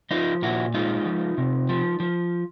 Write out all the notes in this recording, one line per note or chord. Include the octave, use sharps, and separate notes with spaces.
F3 D#4 F4
A#2 E4 F#4
G#3 D#4 F4
F3
C3
F3
F3